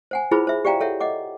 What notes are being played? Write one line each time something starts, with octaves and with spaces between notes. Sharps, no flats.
C5 F#5 G#5
E4 F4 G#4 B4 C5 B5
C5 E5
G4 D5 F5 G5 A#5
A4 C#5 E5 F#5
D#5 F#5 D6